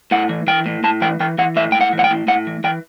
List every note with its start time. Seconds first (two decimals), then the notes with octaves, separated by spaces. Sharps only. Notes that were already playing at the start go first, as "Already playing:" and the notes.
0.11 A2 F#5
0.29 E3
0.47 E3 G5
0.66 A2
0.84 A2 A5
1.01 E3 G5
1.20 E3 G5
1.38 E3 F#5
1.56 A2 E5
1.72 A2 G5
1.81 F#5
1.93 E3
1.99 F#5
2.04 G5
2.10 A2
2.28 A2 F#5
2.47 E3
2.64 E3 G5